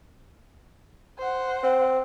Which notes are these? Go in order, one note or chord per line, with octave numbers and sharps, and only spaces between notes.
C5 F#5
C4